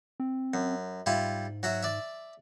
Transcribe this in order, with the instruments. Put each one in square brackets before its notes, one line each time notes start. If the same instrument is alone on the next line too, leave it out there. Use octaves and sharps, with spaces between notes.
[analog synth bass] C4
[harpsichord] F#2
[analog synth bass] G#2 [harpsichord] G3 E4 F4
[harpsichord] F#3 F#4 E5
D5 E5